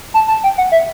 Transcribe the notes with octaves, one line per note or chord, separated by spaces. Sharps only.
A5
A5
G5
F#5
E5